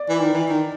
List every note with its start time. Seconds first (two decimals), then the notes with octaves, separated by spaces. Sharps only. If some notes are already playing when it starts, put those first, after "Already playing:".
Already playing: D5
0.09 E3
0.20 D#3
0.34 E3
0.49 D#3